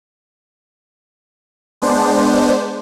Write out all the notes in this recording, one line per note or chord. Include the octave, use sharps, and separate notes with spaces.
G#3 B3 D4 C5